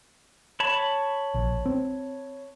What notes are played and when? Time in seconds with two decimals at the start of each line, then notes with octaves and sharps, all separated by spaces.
0.60 C#5 A5 B5
1.34 A#1
1.66 C4